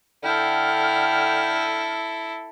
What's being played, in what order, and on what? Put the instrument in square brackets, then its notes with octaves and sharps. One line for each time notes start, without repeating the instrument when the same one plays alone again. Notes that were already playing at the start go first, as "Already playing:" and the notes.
[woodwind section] D3 G5 F6 [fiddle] E4 A4